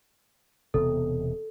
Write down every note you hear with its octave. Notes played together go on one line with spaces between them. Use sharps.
E1 C3 B3 A4